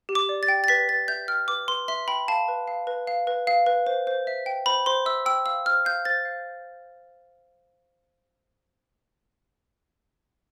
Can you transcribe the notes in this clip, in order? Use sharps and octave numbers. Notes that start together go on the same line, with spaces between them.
G4
D6
D5
A6
G5
A6
B4 B6
B4 A6
E5 G6
G5 F6
B4 D6
B4 C6
E5 C6
G5 B5
F5 A5
B4
F5
B4
F5
B4
F5
B4
C5
C5
E5
G5
C5 B5
C5 C6
E5 E6
G5 E6
F5 E6
C5 F6
F5 G6
C5 A6
F5